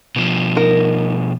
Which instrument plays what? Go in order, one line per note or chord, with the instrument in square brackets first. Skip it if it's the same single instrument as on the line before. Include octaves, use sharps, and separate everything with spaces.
[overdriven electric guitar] B2 F3
[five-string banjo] D#4 A#4